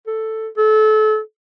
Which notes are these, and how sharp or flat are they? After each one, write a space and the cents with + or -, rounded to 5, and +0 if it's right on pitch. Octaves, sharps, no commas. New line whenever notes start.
A4 +5
A4 -30